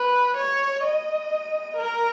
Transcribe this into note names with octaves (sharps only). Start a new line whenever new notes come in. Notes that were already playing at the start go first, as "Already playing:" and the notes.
Already playing: B4
C#5
D#5
A#4